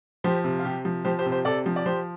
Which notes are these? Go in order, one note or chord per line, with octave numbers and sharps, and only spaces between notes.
F3 G4 C5
C3
F4
C3 G4
F3
F3 G4 C5
G4 C5
C3
G4 C5
C3 A4 D5
F3
D5
F3 G4 C5